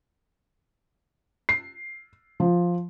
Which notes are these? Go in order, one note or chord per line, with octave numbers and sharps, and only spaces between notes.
C7
F3